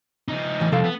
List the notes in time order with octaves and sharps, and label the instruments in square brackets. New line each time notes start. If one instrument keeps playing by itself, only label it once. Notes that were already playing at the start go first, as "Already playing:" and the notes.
[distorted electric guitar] F3 D#4
[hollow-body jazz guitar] A2 E3
[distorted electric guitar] C2 [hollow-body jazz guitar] F3 A4 F5
[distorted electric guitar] B3